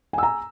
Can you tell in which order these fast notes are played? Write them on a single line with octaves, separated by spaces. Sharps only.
G#5 E6 A#5